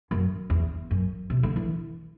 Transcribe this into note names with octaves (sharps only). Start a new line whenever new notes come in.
F#2
E2
F#2
C3
D3
E3